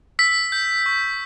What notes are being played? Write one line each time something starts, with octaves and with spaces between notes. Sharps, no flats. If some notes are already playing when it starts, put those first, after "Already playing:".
E6 B6
G6
C#6